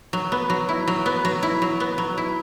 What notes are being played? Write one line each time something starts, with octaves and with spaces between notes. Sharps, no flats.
F#3
B3
F#3
E4
F#3
B3
F#3
E4
F#3
B3
F#3
E4